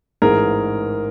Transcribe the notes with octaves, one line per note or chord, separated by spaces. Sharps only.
A1 G#2 E3 G#4 A#4